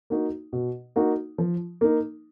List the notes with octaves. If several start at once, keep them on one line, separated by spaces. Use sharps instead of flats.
A#3 D#4 F#4
B2
A#3 D#4 F#4
F3
A#3 D#4